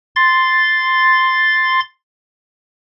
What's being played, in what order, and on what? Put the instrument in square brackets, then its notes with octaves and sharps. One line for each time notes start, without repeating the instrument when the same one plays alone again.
[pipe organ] C6 A6